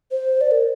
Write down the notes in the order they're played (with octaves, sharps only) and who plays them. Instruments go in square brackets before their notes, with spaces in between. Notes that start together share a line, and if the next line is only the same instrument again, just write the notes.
[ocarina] C5
D5
A#4